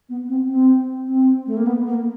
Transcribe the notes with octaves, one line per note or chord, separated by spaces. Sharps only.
B3
C4
C4
C4
A3
A#3
B3
A#3